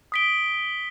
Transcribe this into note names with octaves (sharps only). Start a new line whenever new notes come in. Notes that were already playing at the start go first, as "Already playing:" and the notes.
D#6 B6 D7 G7